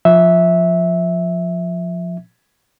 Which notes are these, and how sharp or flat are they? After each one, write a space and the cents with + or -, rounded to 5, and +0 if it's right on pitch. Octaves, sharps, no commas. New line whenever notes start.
F3 +10 E5 -10